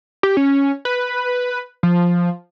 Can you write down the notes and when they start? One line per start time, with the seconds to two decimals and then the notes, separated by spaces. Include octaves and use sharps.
0.23 G4
0.37 C#4
0.85 B4
1.83 F3